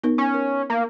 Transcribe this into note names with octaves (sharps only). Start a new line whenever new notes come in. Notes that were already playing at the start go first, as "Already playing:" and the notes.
B3 D#4 A#4
C#4
A#4
A#3